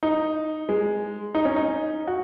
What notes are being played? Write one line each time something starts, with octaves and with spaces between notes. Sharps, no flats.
D#4
G#3
D#4
C#4
D#4
F#4